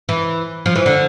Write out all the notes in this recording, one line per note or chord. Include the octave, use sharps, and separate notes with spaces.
E3
F3
E3
D3